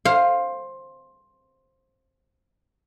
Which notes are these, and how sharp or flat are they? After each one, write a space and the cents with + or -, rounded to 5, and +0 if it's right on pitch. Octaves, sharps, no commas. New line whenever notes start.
C5 +15 F5 +0